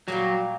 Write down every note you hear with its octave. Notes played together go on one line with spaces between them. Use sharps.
A#2 F#3 G3 A#3